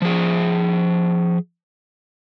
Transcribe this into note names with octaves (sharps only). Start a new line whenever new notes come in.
F3 G#4